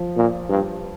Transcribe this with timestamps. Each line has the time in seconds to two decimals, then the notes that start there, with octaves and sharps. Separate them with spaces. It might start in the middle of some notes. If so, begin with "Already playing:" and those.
Already playing: F3
0.16 A#2
0.49 G2